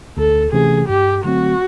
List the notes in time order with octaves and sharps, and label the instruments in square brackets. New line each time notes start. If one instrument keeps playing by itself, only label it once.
[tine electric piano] D2 [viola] A4
[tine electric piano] C3 E3 A3 C#4 [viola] G#4
[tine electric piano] G2 [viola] G4
[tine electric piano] D3 F#3 A3 C4 [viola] F#4